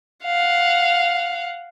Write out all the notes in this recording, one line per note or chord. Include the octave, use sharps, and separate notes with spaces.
F5 F#5